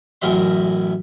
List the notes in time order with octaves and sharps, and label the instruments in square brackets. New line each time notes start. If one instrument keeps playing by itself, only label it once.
[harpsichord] A1 F#2 A#4 E5 C6